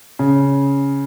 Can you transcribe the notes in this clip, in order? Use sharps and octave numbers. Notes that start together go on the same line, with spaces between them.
C#3